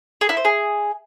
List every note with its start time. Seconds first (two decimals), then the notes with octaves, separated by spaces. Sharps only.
0.21 G#4
0.29 E4
0.37 C5
0.45 G#4